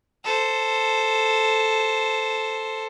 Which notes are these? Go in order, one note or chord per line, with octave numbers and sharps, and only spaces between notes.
A4 C5